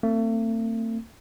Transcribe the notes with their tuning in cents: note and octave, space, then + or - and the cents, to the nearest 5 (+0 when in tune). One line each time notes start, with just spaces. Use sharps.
A3 +40 C4 +5